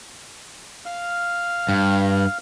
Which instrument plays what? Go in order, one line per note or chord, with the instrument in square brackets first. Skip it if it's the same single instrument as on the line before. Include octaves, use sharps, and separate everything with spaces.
[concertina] F5 F6
[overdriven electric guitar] G2